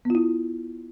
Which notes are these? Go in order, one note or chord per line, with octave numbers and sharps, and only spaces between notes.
B3 E4 F4